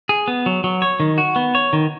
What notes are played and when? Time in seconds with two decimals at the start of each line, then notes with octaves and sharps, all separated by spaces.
0.09 G#4
0.28 B3
0.46 F#3
0.64 F#3
0.82 C#5
1.00 D#3
1.18 F#4
1.36 B3
1.55 C#5
1.73 D#3